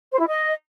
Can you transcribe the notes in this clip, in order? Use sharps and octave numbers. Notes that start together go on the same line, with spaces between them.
C5
E4
D#5